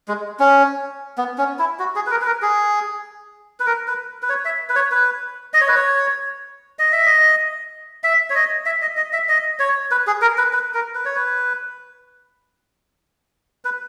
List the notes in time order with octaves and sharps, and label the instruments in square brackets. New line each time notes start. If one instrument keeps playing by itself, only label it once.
[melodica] G#3
C#4
B3
C#4
E4
F#4
G#4
B4
A#4
B4
A#4
G#4
B4
A#4
B4
B4
C#5
E5
B4
C#5
B4
D#5
C#5
B4
C#5
D#5
E5
D#5
E5
C#5
D#5
E5
D#5
D#5
E5
D#5
C#5
B4
G#4
A#4
B4
B4
A#4
B4
C#5
B4
B4